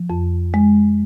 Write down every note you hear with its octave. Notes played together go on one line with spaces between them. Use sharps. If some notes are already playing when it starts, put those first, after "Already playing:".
Already playing: F3
F2
G#3